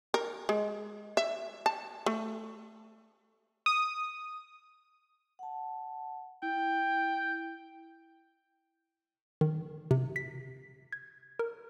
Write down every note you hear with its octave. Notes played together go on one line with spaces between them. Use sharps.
A#4
G#3
E5
A5
A3
D#6
F#5 A5
E4 G5
D#3
C3
B6
G#6
A#4